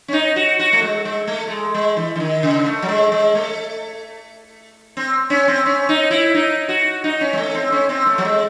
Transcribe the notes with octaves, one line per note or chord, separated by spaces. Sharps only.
C#4
D#4
F#4
F#4
A3
G#3
G#3
A3
A3
G#3
G#3
E3
E3
D#3
C#3
A3
F#3
G#3
G#3
A3
C4
C#4
C4
C#4
D#4
E4
D#4
F#4
D#4
C#4
G#3
A3
C4
C#4
C4
A3
F#3
G#3